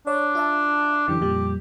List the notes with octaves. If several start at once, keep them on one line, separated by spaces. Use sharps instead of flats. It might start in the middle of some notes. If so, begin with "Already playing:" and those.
D4 C#5 D5
F4 E5 A5
F#2 D3 E3 G4
F2 A#2 G3